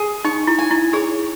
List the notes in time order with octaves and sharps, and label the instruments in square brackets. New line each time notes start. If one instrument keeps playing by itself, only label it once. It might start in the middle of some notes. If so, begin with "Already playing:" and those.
Already playing: [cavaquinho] G#4
[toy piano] D#4 [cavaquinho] C#6
[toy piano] E4
[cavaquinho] G#5
[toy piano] E4
[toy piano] G#4 [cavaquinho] C#5